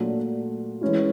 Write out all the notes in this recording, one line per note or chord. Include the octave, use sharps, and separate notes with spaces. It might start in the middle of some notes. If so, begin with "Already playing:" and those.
Already playing: A#2 F#3 A3 D4
E3 G#3 C#4 E4